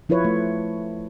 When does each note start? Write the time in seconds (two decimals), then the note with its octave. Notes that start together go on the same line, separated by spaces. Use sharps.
0.09 F3 E4 F4 B4 C#5
0.25 A3